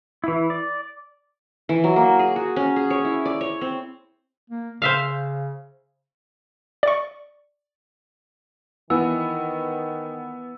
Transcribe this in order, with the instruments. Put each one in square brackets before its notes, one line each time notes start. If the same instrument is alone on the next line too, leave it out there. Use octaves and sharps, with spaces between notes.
[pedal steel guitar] E3 E4
D5
[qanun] E3
F#3
A#3
G#4
F#4
C#4
G#4
C#5
E4
D5
C#5
C4
[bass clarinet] A#3
[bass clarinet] C#3 [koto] C5 E5 F5
[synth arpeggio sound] D5 C#6
[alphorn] D#3 [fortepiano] E3 [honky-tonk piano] B3 [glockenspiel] E6